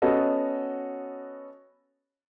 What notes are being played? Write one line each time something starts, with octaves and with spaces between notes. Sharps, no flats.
B3 C#4 F#4 A4 D#5